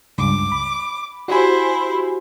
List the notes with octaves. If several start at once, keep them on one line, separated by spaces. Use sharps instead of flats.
C#2 G2 D6
B5
E4 F#4 G4 C5 G#5